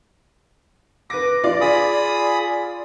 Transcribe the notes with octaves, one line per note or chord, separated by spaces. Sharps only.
B4 D6 A#6
F4 D5
G#4 B5 D#6